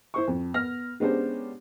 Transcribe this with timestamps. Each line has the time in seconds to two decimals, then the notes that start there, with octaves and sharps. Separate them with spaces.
0.14 E4 C5 C#6
0.28 F2
0.54 B3 F6 A#6
1.00 G#3 B3 C#4 D4 G4 C5